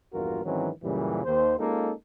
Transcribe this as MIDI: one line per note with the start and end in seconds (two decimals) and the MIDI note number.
0.13 0.42 34
0.13 0.42 40
0.13 0.42 43
0.13 0.42 65
0.13 0.42 66
0.13 0.42 70
0.45 0.69 44
0.45 0.69 51
0.45 0.69 52
0.45 0.69 54
0.45 0.69 60
0.45 0.69 61
0.83 1.24 42
0.83 1.24 46
0.83 1.24 49
0.83 1.24 52
0.83 1.24 55
1.25 1.54 39
1.25 1.54 72
1.59 1.91 56
1.59 1.91 58
1.59 1.91 61
1.59 1.91 63
1.59 1.91 65
1.59 1.91 69